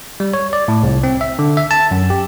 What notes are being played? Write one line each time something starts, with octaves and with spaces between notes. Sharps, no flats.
G3
C#5
D5
A2
C2
C4
E5
D3
E5
A5
F#2
G4